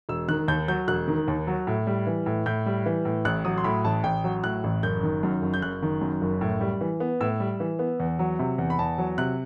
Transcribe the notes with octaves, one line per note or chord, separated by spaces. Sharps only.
E1 E6
D#3 F#6
D#2 G6
F#3 G6
E1 F#6
D#3
D#2
F#3
A2
G3
E3
A2
A2 G6
G3
E3
A2
A1 F#6
F#3 D#6
C6
A2 B5
A1 A5
A1 G5
F#3
A2 F#6
A1
F#1 G6
D#3
F#2
F#1
G6
F#1 F#6
D#3
F#2
F#1
A2
G3
E3
B3
A2 E6
G3
E3
B3
E2
F#3
C3
E2
B5
E2 A5
F#3
C3 F#6